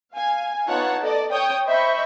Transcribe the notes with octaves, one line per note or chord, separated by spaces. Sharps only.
F5 G#5
B3 D#4 F4 C#5 F#5 A5
A4 D5 D#5
C#5 G5 D#6 G6
C5 D#5 E5 B5 C#6 G6